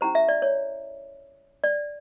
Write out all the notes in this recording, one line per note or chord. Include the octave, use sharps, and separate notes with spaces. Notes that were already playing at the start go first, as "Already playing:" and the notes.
C#4 E4 G4 C5 A#5
E5
D5
C#5
D5